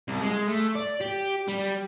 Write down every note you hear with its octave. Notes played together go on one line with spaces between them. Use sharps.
C2
G#3
A3
D5
G4
G3